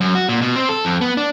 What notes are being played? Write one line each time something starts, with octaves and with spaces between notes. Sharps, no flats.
F#2
F#4
A#2
B2
C4
A4
F2
B3
D4